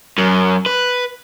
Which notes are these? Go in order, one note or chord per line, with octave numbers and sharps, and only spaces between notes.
F#2
B4